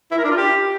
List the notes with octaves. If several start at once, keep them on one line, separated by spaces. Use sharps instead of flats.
E4
A#4
D4
F4
G4